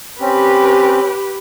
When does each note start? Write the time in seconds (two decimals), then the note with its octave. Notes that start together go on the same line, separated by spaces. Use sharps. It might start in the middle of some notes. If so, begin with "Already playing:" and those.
0.21 C4 C#4 G4 B4